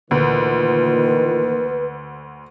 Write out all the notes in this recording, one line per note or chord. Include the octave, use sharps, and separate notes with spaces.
D2 A#2 D#3 E3 B4